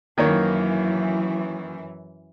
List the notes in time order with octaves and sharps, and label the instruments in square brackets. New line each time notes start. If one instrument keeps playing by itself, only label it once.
[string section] F#2 E3 [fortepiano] D#3 A#3 C#5